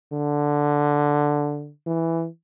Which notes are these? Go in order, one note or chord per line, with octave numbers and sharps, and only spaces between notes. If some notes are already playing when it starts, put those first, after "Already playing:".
D3
E3